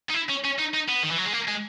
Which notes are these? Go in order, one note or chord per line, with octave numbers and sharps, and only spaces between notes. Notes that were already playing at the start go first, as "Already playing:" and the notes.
D#4
E4
C#4
C#4
D#4
D#4
B3
D#3
E3
F#3
G#3
A#3
G#3